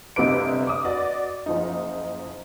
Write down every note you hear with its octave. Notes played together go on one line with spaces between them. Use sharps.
G1 C3 D#4 B4 D6 D7
D6 D#6
F#4 B4 D5 D#5
F#1 F3 D#4